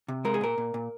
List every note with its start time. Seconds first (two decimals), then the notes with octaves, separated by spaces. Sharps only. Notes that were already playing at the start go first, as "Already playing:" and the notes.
0.08 C3
0.25 G#3 A#4
0.34 G#4
0.41 A#2 A#4
0.58 A#2
0.74 A#2